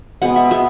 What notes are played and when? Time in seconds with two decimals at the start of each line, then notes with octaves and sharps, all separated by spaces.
0.22 B2 G#3 B3 F#5
0.36 E5
0.51 B2 G#3 B3 E5